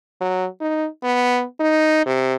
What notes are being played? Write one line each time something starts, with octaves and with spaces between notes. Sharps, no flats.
F#3
D#4
B3
D#4
C3